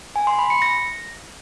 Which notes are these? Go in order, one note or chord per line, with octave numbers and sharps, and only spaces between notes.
G#5
C6
B5
C#7
A#6